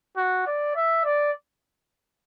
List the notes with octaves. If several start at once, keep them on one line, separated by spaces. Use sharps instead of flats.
F#4
D5
E5
D5